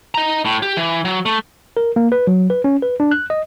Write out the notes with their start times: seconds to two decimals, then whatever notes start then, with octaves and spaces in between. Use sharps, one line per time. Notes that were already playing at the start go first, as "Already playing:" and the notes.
0.15 D#5 A#5
0.45 A2
0.62 G4
0.77 E3
1.05 F#3
1.26 A3
1.77 A#4
1.96 A#3
2.12 B4
2.27 F#3
2.50 B4
2.64 C#4
2.82 B4
3.00 D4
3.11 F#6
3.30 D#5